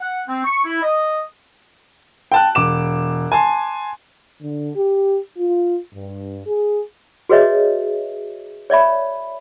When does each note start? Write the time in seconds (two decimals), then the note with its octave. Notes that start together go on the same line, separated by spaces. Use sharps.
0.01 F#5
0.28 C4
0.44 C#6
0.64 E4
0.82 D#5
2.32 G5 A5 F#6
2.55 E1 D6 E7
3.32 G#5 A5 C6
4.40 D3
4.75 G4
5.37 F4
5.94 G2
6.46 G#4
7.29 F#4 G#4 B4 C#5 D#5 E5
8.70 C#5 D5 E5 B5